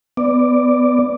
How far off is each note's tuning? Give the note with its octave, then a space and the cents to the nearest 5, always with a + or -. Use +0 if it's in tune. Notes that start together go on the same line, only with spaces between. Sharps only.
B3 +20 D5 +0